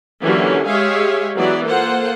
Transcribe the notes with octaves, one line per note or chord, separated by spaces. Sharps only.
D3 E3 F#3 A#3 C#4 G4
G#3 G4 G#4 C#5 E5 F5
E3 F#3 B3 D5
A#3 F4 A4 C5 F#5